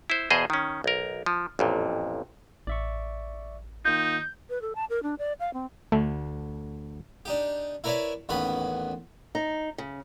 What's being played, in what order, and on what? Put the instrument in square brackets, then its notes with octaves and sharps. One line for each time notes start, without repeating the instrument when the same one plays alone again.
[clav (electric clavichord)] E4 C5
E2 B2 G#4 C5 D#5
D#3 C#4
B1 A#4
F3
A1 F2 A#2
[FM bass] A1 [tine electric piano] D5 E5 C#6
[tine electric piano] D#3 A#3 F4 [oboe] D#4 [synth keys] G6
[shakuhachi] B4
A4
A5
A#4
D4
D5
F5
C4
[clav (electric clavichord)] D2 D3 [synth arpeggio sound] A3
[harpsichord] D4 D#4 G4
E4 A#4 B4 C#5 D5 E5
A1 D#2 B3 C#4 B5
[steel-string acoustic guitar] D#4
C#3